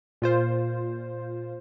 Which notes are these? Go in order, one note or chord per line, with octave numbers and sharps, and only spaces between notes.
A#2 F4 C5